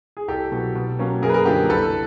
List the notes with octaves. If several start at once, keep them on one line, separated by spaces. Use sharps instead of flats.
G#4
C2 G4 A4
B2 F#3
B2
F#3 A#3 C#4
F#2 G#4 A#4
B4
G#4 A#4
D3 F3 A#3 G4 A4
C2 A4 B4